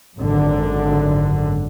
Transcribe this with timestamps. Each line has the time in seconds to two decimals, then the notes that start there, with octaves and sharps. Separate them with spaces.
0.17 G#1 F#2 D3